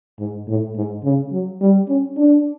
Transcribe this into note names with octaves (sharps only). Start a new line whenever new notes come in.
G#2
A2
G#2
C#3
F#3
G3
C#4
D4